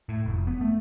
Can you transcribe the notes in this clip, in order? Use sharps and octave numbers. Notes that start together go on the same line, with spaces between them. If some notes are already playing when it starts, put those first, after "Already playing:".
A2
F1
B3
A3